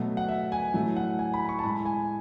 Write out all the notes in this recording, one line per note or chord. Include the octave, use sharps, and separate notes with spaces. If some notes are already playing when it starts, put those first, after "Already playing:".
Already playing: B2 F#3 A3
F#5
E5
G#5
A2 F#3 A3
F#5
G#5
B5
C#6
A5
A2 G#3 B5
G#5